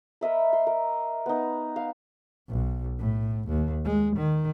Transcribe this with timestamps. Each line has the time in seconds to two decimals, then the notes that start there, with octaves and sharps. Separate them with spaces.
0.21 A#4 D#5 E5 B5
0.53 C6
0.67 A#4
1.26 B3 D#4
1.76 F5
2.49 B1
2.98 A2
3.48 D#2
3.85 G#3
4.16 D#3